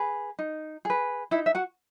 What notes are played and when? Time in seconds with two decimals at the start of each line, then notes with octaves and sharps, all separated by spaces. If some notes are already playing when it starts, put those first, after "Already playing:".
Already playing: G#4 B4
0.39 D#4
0.85 G#4 B4
1.31 D#4 E4 E5
1.46 E5
1.55 F#4 F#5